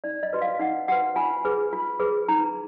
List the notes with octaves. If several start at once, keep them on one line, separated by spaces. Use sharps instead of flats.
D#4 D5
D#5
F#4 B4
F5
D#4 F#5
F#4 B4 F#5
F4 G#5
G#4 B4
F4
G#4 B4
D#4 A#5